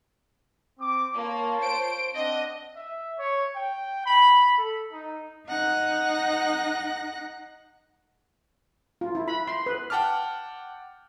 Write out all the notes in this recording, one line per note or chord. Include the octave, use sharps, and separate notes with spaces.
C4 D6
A#3 F4 C#5 A5
C5 D7
C4 D4 D#5 F#5
E5
C#5
G5
B5
A4
D#4
D#4 F#5 F#6 A#6
F4
E4
B5
C6
B4
F#5 G5 A5 D6 F6